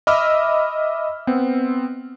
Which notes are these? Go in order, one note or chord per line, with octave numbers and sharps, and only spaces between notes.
D#5 E5 B5 D6 E6 F6
B3 C4